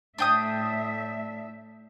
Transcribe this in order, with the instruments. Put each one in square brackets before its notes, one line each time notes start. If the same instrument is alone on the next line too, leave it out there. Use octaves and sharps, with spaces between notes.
[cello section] A2 E5 [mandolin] D4 G5 D#6